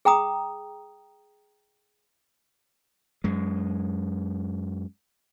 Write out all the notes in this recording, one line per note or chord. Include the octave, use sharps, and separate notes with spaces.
G#4 G5 A#5 D#6
F#2 G#3